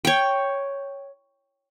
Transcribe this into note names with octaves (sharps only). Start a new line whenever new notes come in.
C#5 G5